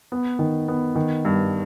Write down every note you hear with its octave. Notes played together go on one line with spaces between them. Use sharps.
B3
D#3
B3
D#3
G2